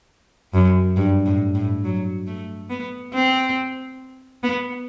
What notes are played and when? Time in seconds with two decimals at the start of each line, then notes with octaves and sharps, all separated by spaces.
0.54 F#2
0.97 G2
1.26 A2
1.55 A2
1.84 F#3
2.27 A3
2.70 B3
3.14 C4
4.43 B3